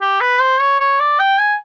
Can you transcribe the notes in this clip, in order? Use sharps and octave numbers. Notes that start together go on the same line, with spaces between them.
G4
B4
C5
C#5
C#5
D5
G5
G#5